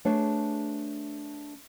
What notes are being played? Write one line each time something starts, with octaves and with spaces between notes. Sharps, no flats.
A3 D4 G#4 B4 C#5